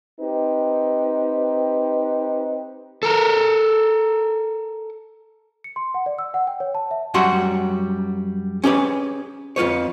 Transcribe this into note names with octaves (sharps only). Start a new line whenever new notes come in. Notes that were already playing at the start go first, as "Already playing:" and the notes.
C4 D#4 G4 B4
A4 A#4
C#7
C6
F#5
D5
E6
F#5
G5
C#5
A5
E5
F#2 F#3 G3 F#4 F#5 C6
C#4 G4 G#4 B4
F2 F4 B4 C#5